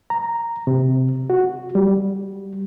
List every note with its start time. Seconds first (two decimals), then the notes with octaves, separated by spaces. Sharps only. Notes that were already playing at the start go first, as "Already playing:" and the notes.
0.10 A#5
0.67 C3
1.30 F#4
1.75 G3